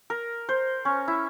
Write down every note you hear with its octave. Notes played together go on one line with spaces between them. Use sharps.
A#4
C5
C#4
E4